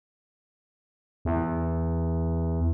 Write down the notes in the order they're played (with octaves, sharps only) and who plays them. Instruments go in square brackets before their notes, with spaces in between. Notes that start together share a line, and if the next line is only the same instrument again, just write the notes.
[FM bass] E2